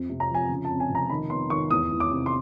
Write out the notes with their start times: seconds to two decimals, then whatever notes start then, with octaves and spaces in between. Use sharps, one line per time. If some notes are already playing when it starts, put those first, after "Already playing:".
Already playing: F2
0.10 C3
0.20 A#5
0.29 F3
0.35 G#5
0.49 C#3
0.65 A5
0.70 F2
0.80 G#5
0.90 F1
0.95 A#5
1.10 D#3 B5
1.30 B3 C6
1.50 D#3 C#6
1.70 E2 D#6
1.91 E2
2.00 D6
2.11 C3
2.26 C6